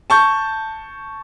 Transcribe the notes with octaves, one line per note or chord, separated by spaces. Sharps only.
A5 C#6 G6